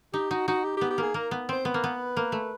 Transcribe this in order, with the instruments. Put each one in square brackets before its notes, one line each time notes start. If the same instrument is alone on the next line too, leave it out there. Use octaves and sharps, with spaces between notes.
[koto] D#4 [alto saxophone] G4
[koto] D#4 [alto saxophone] F#4
[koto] D#4 [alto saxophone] F#4
[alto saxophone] G4
G4
[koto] B3
[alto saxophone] G4
[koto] A#3 [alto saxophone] G#4
[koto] A#3 [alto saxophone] A#4
[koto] B3
[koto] C4 [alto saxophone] C5
[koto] B3 [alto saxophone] B4
[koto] A#3
B3
A#3
A3